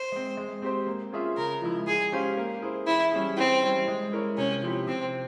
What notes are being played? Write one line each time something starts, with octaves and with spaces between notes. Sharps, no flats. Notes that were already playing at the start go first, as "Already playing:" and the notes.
Already playing: C5
G#3 C4
G#3
C4 G4 C5
A#3
C#4 F4 G#4 E5
C#3 A#4
F3 G#3 E4
G#3 G#4
C#4 G4 C5 F5
A#3
E4 G#4 C5
E3 E4
G3 C#4 E4 G#4
E3 C4
G3 C#4 E4
G#3
E4 A#4 C#5
C3 C#4
F3 C4 E4 G4
C3 C4